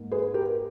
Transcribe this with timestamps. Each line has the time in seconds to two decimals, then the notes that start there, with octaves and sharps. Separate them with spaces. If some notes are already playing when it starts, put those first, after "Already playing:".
Already playing: G#2 A#3
0.11 G#4 B4
0.34 G4 A#4